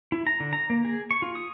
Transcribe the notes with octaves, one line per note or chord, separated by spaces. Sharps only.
E4
A#5
D3
A#5
A#3
G#4
C#6
F4
D#6